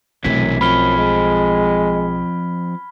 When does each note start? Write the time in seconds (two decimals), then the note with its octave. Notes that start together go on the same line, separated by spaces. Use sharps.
0.24 B1 F#2 C3 E3 A3 G#6 B6
0.61 F#2 F3 C4 B5 F6 G7
0.97 G#3